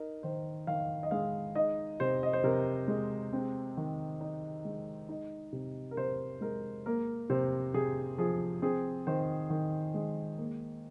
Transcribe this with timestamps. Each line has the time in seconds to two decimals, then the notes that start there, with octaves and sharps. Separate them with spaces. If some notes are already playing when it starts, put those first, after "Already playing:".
Already playing: D#4 A#4
0.23 D#3 C5
0.67 D#3 F5
1.03 D#5
1.11 G#3 F5
1.55 D#4 D#5
2.00 C3 C5
2.23 D#5
2.33 C5
2.44 C3 A#4
2.88 G#3
3.33 C4
3.77 D#3
4.21 D#4
4.65 G#3
5.09 D#4
5.53 C3
5.91 A#4
5.97 C3 C5
6.41 G#3 A#4
6.86 A#3 A#4
7.30 C3 C5
7.74 C3 G#4
8.18 F3 G#4
8.62 C4 G#4
9.07 D#3 C5
9.50 D#3
9.94 G#3
10.38 A#3